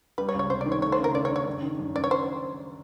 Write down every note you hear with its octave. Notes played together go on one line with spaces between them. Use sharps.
G3 B4
C#5
C#2
C#5
C3 C5
D#3 D5
C#5
A3 C#5
C5
C#3
A#4
C#3 D5
C#5
D4
C#5
F#2
D#3
F#2
F#2 D5
C#5
C5